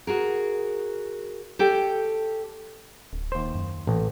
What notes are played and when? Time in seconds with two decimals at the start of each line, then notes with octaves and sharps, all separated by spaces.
0.07 F#4 G#4 A#4
1.59 G4 A4 C#5 G5
3.13 D1
3.32 D#2 C5
3.55 F#2
3.87 A1 A#2